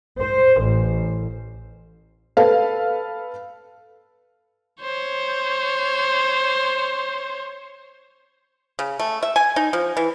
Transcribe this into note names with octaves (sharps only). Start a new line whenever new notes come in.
C5
A1
A4 B4 F5
C5 C#5
C#3
A3
E5
G#5
D#4
F3
E3